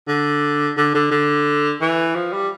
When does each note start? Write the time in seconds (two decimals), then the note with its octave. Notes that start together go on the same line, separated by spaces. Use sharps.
0.08 D3
0.77 D3
0.95 D3
1.11 D3
1.81 E3
2.16 F3
2.33 G3